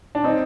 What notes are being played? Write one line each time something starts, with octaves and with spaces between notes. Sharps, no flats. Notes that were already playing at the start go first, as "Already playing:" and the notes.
D4
C4 D#4